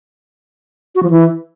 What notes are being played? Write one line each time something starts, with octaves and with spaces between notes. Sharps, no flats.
F#4
F3
E3